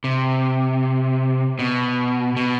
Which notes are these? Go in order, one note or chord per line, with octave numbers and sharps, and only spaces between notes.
C3
B2
B2